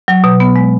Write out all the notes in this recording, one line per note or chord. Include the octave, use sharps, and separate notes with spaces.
F#3
B2
B3
G#3